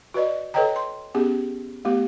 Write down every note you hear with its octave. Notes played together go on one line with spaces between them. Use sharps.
F#4 B4 D5 D#5
A4 B4 C#5 D#5 G5 A#5
C6
B3 C#4 G4 G#4
A3 B3 G4